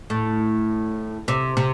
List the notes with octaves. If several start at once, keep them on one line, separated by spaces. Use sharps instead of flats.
A2
C3
C3